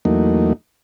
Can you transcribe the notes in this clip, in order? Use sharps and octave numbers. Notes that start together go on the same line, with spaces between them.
E2 F#3 A3 A#3 D#4